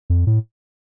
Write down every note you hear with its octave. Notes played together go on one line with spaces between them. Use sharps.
F2
A2